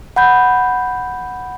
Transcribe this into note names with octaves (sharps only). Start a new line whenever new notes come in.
F#5 B5 G6